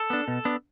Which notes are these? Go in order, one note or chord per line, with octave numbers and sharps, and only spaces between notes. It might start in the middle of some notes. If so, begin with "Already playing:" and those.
Already playing: A4
B3 D4
B2
B3 D4